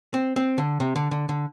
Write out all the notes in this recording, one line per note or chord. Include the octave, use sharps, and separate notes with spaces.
C4
C4
D3
C3
D3
D3
D3